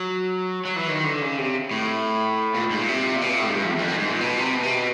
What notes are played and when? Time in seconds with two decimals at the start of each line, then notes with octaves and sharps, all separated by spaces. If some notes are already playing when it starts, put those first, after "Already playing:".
Already playing: F#3
0.65 F#3
0.76 E3
0.88 D#3
1.04 D3
1.22 C#3
1.38 C3
1.71 A2
2.54 A#2
2.70 G#2
2.79 A#2
2.88 C3
3.16 A#2
3.21 B2
3.29 A#2
3.38 A2
3.46 G#2
3.54 G2
3.63 F2
3.72 E2
3.79 F2
3.88 F#2
3.99 G#2
4.10 A#2
4.21 B2
4.37 C3
4.54 B2
4.63 C3
4.71 B2